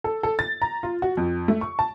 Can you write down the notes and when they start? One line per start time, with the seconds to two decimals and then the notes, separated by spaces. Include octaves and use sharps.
0.04 A4
0.23 A4
0.39 A6
0.62 A#5
0.83 F4
1.02 F#4
1.17 F2
1.48 A3
1.61 C#6
1.79 A5